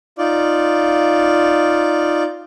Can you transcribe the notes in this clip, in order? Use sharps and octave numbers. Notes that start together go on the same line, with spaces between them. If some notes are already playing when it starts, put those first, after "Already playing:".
D#4 F4 D5